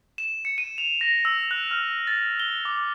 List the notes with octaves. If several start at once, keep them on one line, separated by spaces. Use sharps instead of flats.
E7
C#7
D#7
F7
A#6
E6
F#6
F6
A6
G7
D6